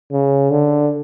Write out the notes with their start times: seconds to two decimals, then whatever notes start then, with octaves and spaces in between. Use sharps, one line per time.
0.12 C#3
0.51 D3